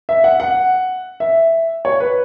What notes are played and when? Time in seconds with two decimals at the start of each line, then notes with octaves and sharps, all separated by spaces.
0.09 E5
0.24 F#5
0.40 F#5
1.20 E5
1.85 C#5
2.00 B4